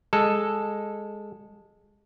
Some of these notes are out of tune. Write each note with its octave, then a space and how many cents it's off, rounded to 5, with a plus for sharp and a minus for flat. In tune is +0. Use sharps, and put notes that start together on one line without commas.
G#3 -10 A4 +0